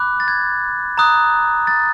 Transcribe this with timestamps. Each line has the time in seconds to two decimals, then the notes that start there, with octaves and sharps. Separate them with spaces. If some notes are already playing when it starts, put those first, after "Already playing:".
Already playing: B5 D6 F#6
0.20 A6
0.28 G#6
0.98 A#5 D#6 F#6
1.67 A6